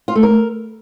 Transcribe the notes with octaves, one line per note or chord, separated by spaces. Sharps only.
F4
A3
A#4